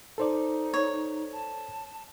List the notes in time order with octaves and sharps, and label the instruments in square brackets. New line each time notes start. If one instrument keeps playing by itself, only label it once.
[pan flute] D#4 [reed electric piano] A4 C5 D5
[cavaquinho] C#5
[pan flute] A5